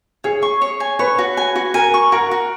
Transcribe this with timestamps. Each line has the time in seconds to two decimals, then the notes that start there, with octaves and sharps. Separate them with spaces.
0.24 G#4 C#5
0.43 C#6
0.62 C#5
0.80 G#5
0.99 B4 C#5
1.19 F#4
1.37 G#5
1.56 F#4
1.74 A#4 G#5
1.94 C#6
2.12 F#4 A#4
2.31 F#4